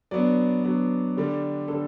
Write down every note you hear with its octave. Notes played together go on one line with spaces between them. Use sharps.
F#3 B3 D4 D5
F#3 B3 D4
D3 G3 D4
D3 G3 D4 A4